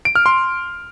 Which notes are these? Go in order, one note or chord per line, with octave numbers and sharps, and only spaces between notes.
D7
F6
C6